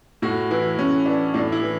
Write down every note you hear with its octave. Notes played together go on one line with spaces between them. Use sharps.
A2 F#4
E3 E4
A2 C#4
E3 D4
A2 D4
E4
E3